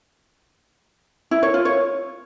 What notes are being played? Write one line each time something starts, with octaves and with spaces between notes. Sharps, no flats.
E4
C#5
F4
C#5